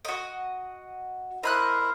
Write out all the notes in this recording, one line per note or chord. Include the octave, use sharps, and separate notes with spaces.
F#4 D#5
E4 A#4 C5 D#5 B5 F#6